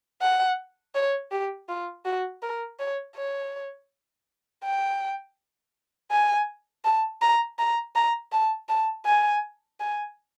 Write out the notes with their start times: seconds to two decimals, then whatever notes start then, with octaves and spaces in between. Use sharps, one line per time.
0.22 F#5
0.95 C#5
1.32 G4
1.69 F4
2.06 F#4
2.43 A#4
2.79 C#5
3.16 C#5
4.64 G5
6.12 G#5
6.85 A5
7.22 A#5
7.59 A#5
7.96 A#5
8.32 A5
8.69 A5
9.06 G#5
9.80 G#5